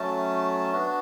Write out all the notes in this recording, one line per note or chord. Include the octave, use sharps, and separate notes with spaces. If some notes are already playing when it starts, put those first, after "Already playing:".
Already playing: F#3 A3 C#4 A5
B3 D4 F#4